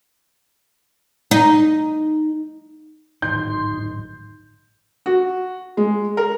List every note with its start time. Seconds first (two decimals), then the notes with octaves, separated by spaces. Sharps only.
1.31 D#4
3.22 D1 G#1 D#3 D#4 C6 G6
5.06 F#4
5.77 G#3
6.17 A#4